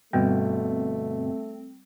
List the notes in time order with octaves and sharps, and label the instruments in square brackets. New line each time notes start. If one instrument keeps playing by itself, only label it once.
[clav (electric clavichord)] G1 B2 G5 [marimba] G3 [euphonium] A3 [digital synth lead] C4